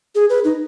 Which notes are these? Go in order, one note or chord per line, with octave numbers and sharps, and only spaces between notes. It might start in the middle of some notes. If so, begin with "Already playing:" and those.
G#4
B4
D#4